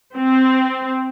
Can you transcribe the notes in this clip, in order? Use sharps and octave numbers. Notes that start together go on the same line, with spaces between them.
C4